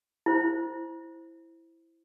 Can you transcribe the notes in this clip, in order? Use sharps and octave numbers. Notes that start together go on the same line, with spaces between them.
E4 C5